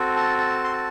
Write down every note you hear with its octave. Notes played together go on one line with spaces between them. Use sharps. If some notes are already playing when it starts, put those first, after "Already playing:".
Already playing: C4 F#4 A4
A5
A5
C6
A5